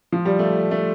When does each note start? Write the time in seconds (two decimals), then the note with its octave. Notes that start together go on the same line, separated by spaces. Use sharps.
0.12 F3
0.25 G3
0.39 A3
0.71 A3